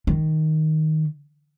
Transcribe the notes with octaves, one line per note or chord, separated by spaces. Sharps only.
D#3